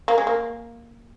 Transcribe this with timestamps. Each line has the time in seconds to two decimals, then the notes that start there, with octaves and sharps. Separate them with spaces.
0.08 A#3
0.18 G#3
0.27 A#3